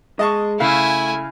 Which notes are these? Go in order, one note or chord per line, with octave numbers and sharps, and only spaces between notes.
G#3 D#5 A5 C#6
C#3 A3 E4 E5 F5 G#5